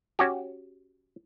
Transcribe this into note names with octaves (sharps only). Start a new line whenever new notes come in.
C#4 F#4 G4